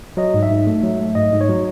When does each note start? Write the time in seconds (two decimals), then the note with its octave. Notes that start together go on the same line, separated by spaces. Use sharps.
0.17 F#3 D#5
0.34 G#2
0.43 E5
0.50 G#2
0.67 A3
0.83 F#3
0.99 A3
1.15 G#2 D#5
1.33 G#2
1.41 C#5
1.49 F#3